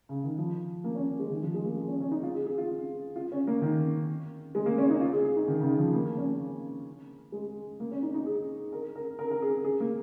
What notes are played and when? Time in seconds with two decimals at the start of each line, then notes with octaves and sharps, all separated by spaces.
0.09 C#3
0.24 D#3
0.38 F3
0.84 A#3
0.95 C#4
1.08 C#4
1.19 G#3
1.30 D#3
1.43 F3
1.54 G#3
1.65 A#3
1.76 A#3
1.88 C#4
2.00 C#4
2.11 D#4
2.23 F4
2.35 G#4
2.46 G#4
2.58 F4
3.16 F4
3.32 C#4
3.47 A#3
3.62 D#3
4.55 G#3
4.66 A#3
4.78 C#4
4.90 D#4
5.01 F4
5.13 G#4
5.25 G#4
5.37 D#4
5.48 D#3
5.59 C#3
5.63 D#3
5.78 F3
5.94 A#3
6.05 A#3
6.17 C#4
6.29 A#3
7.32 G#3
7.80 A#3
7.91 C#4
8.03 D#4
8.14 D#4
8.26 G#4
8.72 A#4
8.95 A#4
9.19 A#4
9.31 A#4
9.42 G#4
9.64 G#4
9.80 A#3